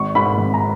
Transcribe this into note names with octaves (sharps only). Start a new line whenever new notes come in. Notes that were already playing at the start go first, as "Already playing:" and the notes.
Already playing: G#1 C#6
G#2 D#3 B5
G#1
A#5